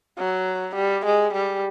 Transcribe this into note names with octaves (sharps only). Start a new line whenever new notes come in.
F#3
G3
G#3
G3